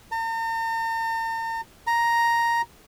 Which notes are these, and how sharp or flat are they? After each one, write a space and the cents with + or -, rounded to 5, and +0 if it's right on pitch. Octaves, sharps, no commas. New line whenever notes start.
A#5 -45
A#5 +5